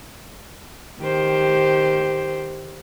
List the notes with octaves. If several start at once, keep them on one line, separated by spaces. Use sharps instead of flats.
D#3 G4 C5